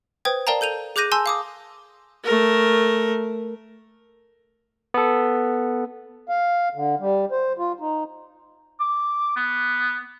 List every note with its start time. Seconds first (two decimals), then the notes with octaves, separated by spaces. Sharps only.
0.25 B4 C5 G5 D#6 G#6
0.47 A#4 D5 F5 G5 A5 A#5
0.61 A4 G6 D#7 F7
0.96 G#4 D6 F#6 G6 A#6 D#7
1.12 G#5 A5 C6 E6 G6
1.26 F5 D6 D#6
2.24 A3 A#4
4.94 B3 A4
6.29 F5
6.75 D3
7.00 G3
7.31 C5
7.58 F4
7.80 D#4
8.80 D6
9.36 B3